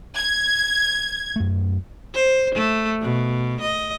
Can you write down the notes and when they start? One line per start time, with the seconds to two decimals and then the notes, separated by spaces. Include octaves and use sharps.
0.16 G#6
1.36 F#2 A3
2.14 C5
2.55 A3
3.02 B2
3.61 D#5